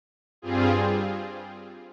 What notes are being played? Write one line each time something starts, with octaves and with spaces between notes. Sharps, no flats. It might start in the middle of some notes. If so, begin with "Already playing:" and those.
G2 G3 C4 F4 G#4